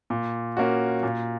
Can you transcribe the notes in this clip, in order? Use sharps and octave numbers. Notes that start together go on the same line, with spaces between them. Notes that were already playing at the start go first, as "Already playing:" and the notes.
A#2
A#3 C#4 F#4
A#2